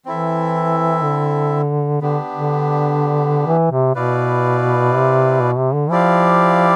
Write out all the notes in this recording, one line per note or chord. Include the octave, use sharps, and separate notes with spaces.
E3 C4 E4 A4 E5
D3
D3 B3 D4 G4
D3
E3
C3
B2 E4 B4 D5 F5
C3
B2
C3
D3
F3 E4 G4 D5 F5